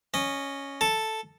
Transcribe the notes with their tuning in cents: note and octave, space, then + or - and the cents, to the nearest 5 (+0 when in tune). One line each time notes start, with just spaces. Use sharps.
C#4 +0 D#5 -15
A4 +0 A5 +0